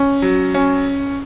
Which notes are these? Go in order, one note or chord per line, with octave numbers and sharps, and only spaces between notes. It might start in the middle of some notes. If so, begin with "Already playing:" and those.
Already playing: C#4
F#3
C#4